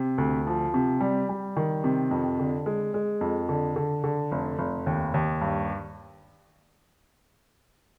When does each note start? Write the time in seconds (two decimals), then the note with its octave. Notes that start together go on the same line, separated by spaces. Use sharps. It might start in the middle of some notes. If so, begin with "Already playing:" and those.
Already playing: C3
0.18 D2
0.47 F3
0.74 C3
1.01 G3
1.29 G3
1.57 D#3
1.84 C3
2.11 F2
2.39 D3
2.66 G#3
2.94 G#3
3.21 F2
3.49 D3
3.76 D3
4.04 D3
4.32 F1
4.59 F1
4.86 D#2
5.14 D#2
5.41 G2